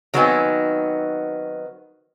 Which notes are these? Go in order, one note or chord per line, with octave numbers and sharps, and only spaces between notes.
D#3 F#3 B3 C4 D#4 G#5